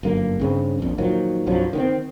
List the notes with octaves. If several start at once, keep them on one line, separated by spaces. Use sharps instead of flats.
G1 F#2 A#3
G2 C#3 C4
A#1 F2
A#2 D#3 F3 F#3
C2 G2 F3 F#3
D#3 B3 C4